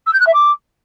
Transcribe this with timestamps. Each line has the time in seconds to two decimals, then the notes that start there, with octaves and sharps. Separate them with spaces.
0.06 E6
0.13 G6
0.20 F#6
0.26 E5
0.33 D6